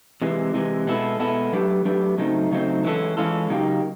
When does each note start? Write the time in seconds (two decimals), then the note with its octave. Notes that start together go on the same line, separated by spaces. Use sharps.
0.22 C3 E3 G#3
0.54 C3 E3 G#3
0.87 B2 G#3 B3 E4 A4
1.20 B2 G#3 B3 E4 A4
1.53 F#3 A3 D4 G4 B4
1.85 F#3 A3 D4 G4 B4
2.18 C#3 F#3 A3 C4 D#4
2.51 C#3 F#3 A3 C4 D#4
2.84 E3 G#3 C#4 F4 A4
3.17 E3 G#3 C#4 F4 A4
3.50 C#3 F#3 A#3 D#4 G4